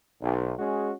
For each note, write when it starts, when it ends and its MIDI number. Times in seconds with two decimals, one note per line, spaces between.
0.22 0.53 35
0.58 0.91 56
0.58 0.91 61
0.58 0.91 66
0.58 0.91 68